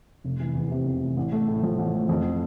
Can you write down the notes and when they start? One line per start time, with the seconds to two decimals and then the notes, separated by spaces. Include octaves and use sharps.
0.24 F1
0.40 E3
0.55 E2
0.71 C3
0.86 F1
1.01 E3
1.17 A1
1.32 A3
1.48 A2
1.63 F3
1.78 A1
1.94 A3
2.09 F2